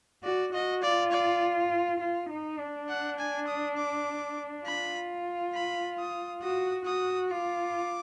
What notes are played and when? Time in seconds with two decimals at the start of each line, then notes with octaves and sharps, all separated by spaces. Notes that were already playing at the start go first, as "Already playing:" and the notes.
0.23 F#4 D5
0.53 F#4 D#5
0.82 F4 D5
1.12 D5
2.01 F4
2.30 D#4
2.59 D4
2.89 F#5
3.19 G#5
3.47 D#6
3.77 D6
4.66 F4 B5
5.54 B5
5.99 D#6
6.42 F#4 D#6
6.86 F#4 D#6
7.31 F4 D6